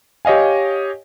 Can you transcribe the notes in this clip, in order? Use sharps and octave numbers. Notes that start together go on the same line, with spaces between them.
G4 C#5 D#5 F5 G#5